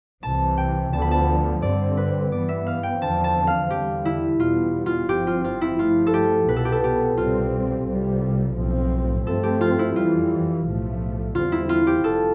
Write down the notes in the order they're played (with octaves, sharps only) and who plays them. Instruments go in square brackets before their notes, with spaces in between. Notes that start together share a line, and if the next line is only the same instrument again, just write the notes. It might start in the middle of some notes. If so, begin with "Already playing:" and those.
[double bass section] C2 C3 E3 [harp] A5
[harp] G5
[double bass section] D2 D3 F3 B3 [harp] A5
[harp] B5
A5
[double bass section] G2 D3 G3 C4 [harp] D5
[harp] B4
[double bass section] G2 E3 B3 [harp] D5
[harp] E5
F5
G5
[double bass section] E2 D3 F3 C4 [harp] A5
[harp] A5
F5
[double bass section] E2 D3 G3 [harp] G4
[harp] E4
[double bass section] E2 B2 G3 B3 [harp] F4
[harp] F4
[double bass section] G1 G2 F3 C4 [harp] G4
[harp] F4
F4
E4
[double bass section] G2 F3 A3 [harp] F4
[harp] A4
G4
[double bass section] C2 B2 B3 [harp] B4
[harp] A4
G4
A4
G4
[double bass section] C2 B2 G3 C4 [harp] F4
[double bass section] C2 C3 G3
B1 A2 F3 C4
[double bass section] G2 F3 A3 C4 [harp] A4
[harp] G4
F4
E4
[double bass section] F2 E3 G3 [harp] F4
[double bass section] B1 A2 F3 A3
[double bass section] E2 D3 G3 C4 [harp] F4
[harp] E4
F4
G4
[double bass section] F1 [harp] A4